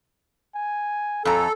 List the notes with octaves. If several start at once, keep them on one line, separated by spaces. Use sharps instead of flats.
G#5
F2 A4 G#5 A#5